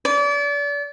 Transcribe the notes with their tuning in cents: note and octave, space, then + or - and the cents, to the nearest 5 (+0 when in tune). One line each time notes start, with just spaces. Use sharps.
D5 -35